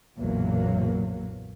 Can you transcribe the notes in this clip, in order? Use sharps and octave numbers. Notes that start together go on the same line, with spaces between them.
F#1 B1 E2 A#2 F#3 A#3